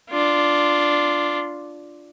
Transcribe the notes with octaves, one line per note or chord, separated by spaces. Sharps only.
D4 F4